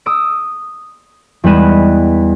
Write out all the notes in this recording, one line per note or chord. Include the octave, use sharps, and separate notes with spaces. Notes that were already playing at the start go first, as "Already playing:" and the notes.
D#6 E6 D7
E2 G3 G#3 B4 D#7 E7